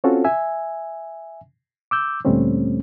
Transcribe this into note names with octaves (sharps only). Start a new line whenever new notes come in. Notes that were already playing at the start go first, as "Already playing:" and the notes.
C4 C#4 F4 F#4 A4
E5 G#5
D6 E6 G6
D2 A#2 G3 A3 C4 C#4